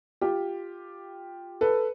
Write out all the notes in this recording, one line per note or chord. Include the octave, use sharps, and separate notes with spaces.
F4 G4
A4 B4